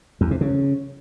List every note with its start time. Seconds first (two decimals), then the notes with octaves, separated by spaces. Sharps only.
0.21 E2
0.31 C3
0.41 C#3